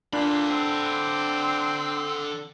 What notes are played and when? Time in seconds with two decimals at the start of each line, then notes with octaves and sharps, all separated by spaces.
0.13 A#2 D3 D4 B5
0.50 C4